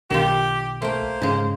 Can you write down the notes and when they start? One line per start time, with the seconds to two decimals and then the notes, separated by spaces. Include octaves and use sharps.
0.10 B1 D#3 D#4 F4 G4
0.82 A3 A#3 C5 G5
1.22 G#2 C#3 G#3